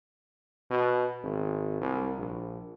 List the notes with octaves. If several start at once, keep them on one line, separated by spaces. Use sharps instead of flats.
B2
G#1
C2
A#1